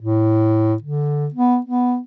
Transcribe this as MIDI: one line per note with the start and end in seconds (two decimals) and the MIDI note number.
0.01 0.74 45
0.82 1.28 50
1.34 1.59 59
1.65 1.99 59